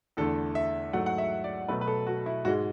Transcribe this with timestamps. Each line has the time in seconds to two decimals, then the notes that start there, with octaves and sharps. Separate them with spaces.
0.17 E2 D3 A3 A4
0.55 E5
0.93 G#2 F#3 A3 F#5
1.06 F#5
1.18 E5
1.44 D5
1.68 B2 F#3 A3 B4
1.81 B4
1.87 A4
2.07 F#4
2.26 E4
2.45 G#2 G#3 F#4